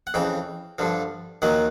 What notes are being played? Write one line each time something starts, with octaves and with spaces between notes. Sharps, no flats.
F#5
F2 C#3 E3 G5
G2 D3 F3
D#2 D#3 F#3 F#5